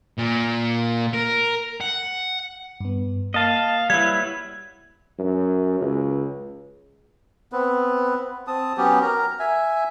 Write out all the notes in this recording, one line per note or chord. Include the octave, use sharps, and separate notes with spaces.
A#2
A#4
F#5
G2 B3
A#3 D#5 F5 A5
F#3 G3 E4 B4 G#6
F#2
C#2
B3 C4 B4
C4 A5 D#6
F#3 B3 C#4 G4
A#4 A#5
E5 G#5